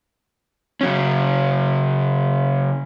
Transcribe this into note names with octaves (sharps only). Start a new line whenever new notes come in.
C#3 F#3 C#4